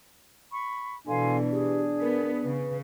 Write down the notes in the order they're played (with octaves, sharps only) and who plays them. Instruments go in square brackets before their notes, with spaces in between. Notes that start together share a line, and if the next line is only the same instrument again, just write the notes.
[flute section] B5 C#6
[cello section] B2 E3 [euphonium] D4 [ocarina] A4 [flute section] F5 G#5 C6
[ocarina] G4 [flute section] G#4
[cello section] B3 [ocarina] A#4
[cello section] C#3 [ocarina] B4